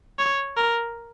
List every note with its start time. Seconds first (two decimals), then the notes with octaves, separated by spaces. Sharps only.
0.19 C#5
0.57 A#4